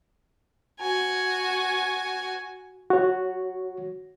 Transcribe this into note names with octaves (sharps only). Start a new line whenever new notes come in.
F#4 G#5
F#4 C#5